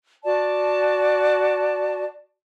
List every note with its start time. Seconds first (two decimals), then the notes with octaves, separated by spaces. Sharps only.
0.24 F#4 D5 A5